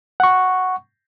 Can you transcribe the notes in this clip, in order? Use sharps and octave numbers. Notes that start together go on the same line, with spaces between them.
F#5 C#6